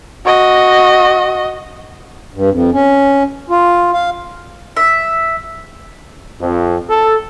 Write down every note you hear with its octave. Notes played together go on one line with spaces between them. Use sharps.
F#4 D#5
G2
F2
C#4
F4
F5
E5
F2
A4